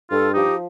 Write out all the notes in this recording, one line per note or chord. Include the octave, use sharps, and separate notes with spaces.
G2 F4 A4
F3 D#4 G4